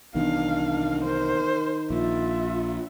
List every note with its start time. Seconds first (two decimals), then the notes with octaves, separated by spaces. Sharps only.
0.15 C2 D#3 E3 B3 D4 F5
1.04 A#4 C5
1.90 A#1 F4 E5